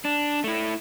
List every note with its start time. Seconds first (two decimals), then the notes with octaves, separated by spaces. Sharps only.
0.05 D4
0.44 A3 E4